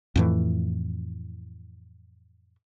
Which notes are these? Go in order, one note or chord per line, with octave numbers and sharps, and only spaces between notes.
F2 A2 E3